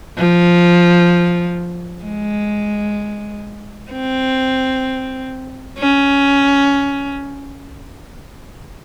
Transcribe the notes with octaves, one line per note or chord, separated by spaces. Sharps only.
F3
G#3
C4
C#4